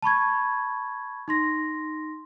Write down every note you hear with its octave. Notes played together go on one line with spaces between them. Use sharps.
A5 B5 C#6 G#6
D#4 C6 A#6